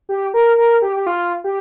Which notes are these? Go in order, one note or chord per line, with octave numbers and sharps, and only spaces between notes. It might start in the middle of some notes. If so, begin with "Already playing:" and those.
G4
A#4
A#4
G4
G4
F4
G4